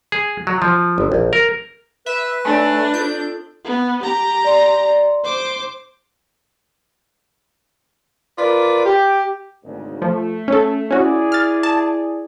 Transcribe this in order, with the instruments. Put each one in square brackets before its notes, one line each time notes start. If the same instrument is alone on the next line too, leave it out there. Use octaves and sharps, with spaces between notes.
[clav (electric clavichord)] G#4
F#3
F3
G1
A#1
A#4
[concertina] B4 [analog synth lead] E5
[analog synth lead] A3 [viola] D4 [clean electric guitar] C#5 D5 G#5
[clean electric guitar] F4 A4 [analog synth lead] G6
[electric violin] B3
G4 A#5
[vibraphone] D5 C6
[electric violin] C5 D6
[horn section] F4 A#4 B4 D5
G4
[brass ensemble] G#1 D2 C#3
[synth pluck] F3 [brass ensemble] A3
[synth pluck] C#4 A4
[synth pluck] C#4 F#4 [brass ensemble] E4 G#4 D5
[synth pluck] F6 A6
A5